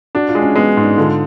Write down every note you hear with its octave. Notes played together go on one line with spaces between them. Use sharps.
D4 F#4
F4
G#3
C#4
G#3 B3
C#4
G#2
D4
D3 F4